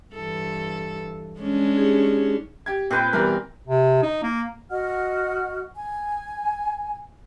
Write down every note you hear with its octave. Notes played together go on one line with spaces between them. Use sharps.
G2 E3 A4
G#3 C#4 D4
D#4 G4 G#4
G4 G#6
A#2 C4 B4 G5
B2 E3 G3 A#4
C3
D#4
A#3
F#4 D#5 F#5 F6
G#5